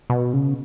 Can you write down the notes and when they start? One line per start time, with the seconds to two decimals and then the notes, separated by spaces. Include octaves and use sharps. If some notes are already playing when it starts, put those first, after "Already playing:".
0.10 B2
0.33 C#3